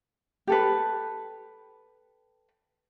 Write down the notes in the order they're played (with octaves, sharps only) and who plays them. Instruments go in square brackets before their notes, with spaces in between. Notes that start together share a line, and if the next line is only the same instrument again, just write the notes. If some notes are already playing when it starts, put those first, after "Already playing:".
[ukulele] G4 A4 B4